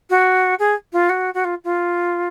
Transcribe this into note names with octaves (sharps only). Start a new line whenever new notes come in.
F#4
G#4
F4
F#4
F#4
F4
F4